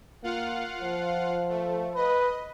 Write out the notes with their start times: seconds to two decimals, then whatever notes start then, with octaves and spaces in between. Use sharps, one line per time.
0.23 A#3 F4 F5 F#5
0.82 F3
1.49 A3
1.95 B4 D#5